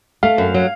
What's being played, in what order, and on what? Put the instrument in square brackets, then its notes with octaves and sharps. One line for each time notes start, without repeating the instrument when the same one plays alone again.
[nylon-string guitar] A3 [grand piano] F5
[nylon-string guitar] F#2
F#3